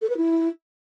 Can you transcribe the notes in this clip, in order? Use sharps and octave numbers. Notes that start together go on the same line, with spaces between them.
A4
B4
E4